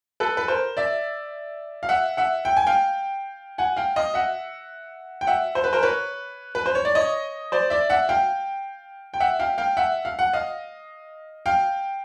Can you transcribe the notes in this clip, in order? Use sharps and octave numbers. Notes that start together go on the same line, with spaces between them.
A4 B4
B4
A#4 C5
D5 E5
F5
E5 F#5
E5 F#5
G5
G#5
F5 G5
F#5 G#5
F5 G5
D#5 F5
E5 F#5
G5
E5 F#5
C5
B4
A#4 C5
B4 C#5
B4
C5
C#5
D5
C#5 D#5
C5 D5
D5 E5
E5 F#5
F5 G5
G5
E5 F#5
F5 G5
F5 G5
E5 F#5
F5
F#5
D#5 F5
F5 G5